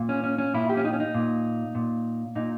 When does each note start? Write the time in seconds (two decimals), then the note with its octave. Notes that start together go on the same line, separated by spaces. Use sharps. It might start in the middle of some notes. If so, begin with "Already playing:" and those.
Already playing: A#2
0.09 C#4
0.24 C#4
0.38 C#4
0.54 A#2 E4
0.69 G4
0.77 C#4
0.85 D#4
0.93 C#4
1.00 D#4
1.14 A#2
1.75 A#2
2.35 A#2 D#4